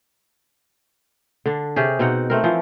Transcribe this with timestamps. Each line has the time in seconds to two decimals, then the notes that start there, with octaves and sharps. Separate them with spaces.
1.46 D3 D4
1.76 C3 C#4 G4 G#4
1.99 B2 C4 D#4 F#5
2.30 A3 C4 A#4
2.44 E3 F3